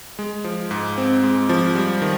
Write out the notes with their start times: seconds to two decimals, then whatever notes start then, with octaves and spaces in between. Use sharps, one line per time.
0.19 G#3
0.44 F3
0.71 G#2
0.98 C4
1.23 G#3
1.49 F3
1.75 G3
2.02 D#3